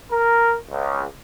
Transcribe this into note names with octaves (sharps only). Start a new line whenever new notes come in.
A#4
C#2